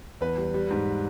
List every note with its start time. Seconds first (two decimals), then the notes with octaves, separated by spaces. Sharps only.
0.21 E2 B4
0.38 G3
0.54 G3
0.70 G#2